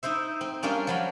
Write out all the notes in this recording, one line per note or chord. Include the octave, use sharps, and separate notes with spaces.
D#4 E4 C5 E5
C4
G3 A#3 C#4 D4 F4
F3 F#3 B5